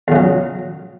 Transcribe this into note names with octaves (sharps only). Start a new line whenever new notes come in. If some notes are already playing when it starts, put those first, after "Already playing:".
E2 C#3 F#3